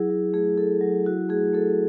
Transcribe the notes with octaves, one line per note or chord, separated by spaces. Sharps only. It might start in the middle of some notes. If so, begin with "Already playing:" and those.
Already playing: F#3 E4 G#4
F#3
A3 G#4
E4 A4
F#3
E4 F#4
A3 G#4
A3 A4